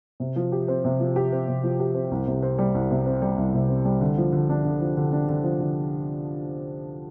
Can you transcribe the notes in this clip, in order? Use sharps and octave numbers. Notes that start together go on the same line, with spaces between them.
C3
F3
G4
C4
C3
F3
G4
C4
C3
F3
G4
C4
C2
C3
C4
G3
C2
C3
C4
G3
C2
C3
C4
G3
D3
F3
D3
D4
D3
F3
D3
D4
D3
F3
D3